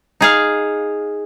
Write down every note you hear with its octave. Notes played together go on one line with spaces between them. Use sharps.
D#4 G#4 F5